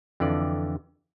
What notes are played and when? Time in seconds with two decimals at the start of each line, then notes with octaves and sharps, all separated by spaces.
0.20 F2 D3 E3 D5